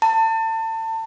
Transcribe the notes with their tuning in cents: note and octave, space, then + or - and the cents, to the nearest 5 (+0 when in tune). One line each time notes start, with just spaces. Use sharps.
A5 +30